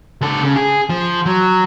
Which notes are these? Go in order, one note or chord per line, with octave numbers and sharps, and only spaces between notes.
C#2 A4
C#3
G#4
F3
F#3